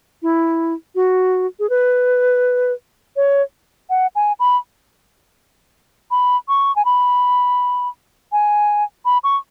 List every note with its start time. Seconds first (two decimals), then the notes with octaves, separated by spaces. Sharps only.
0.22 E4
0.95 F#4
1.59 G#4
1.70 B4
3.16 C#5
3.90 F#5
4.15 G#5
4.40 B5
6.11 B5
6.48 C#6
6.76 G#5
6.85 B5
8.32 G#5
9.05 B5
9.24 C#6